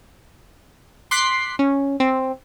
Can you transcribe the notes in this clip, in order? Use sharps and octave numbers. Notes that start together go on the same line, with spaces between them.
C6 D6 F#6 B6 C7
C#4
C4